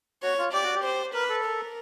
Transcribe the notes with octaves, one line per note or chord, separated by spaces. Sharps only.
F#4 C#5
F4
G4 D5
F#4
G4
C5
A#4 B4
A4
A#4